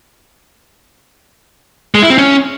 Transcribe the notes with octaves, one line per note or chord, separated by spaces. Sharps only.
G#3
E4
C4
C#4